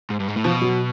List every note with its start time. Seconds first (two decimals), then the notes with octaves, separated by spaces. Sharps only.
0.10 G#2
0.20 G2
0.28 G#2
0.36 A2
0.44 B2 F3
0.62 F#3